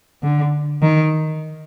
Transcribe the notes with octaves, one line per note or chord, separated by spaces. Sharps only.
D3
D#3